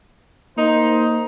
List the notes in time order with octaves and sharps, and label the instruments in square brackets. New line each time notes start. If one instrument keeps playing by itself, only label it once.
[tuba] A#3 [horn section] D#4 C5